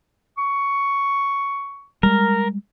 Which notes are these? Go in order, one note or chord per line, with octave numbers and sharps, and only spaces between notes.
C#6
G3 G#3 A#4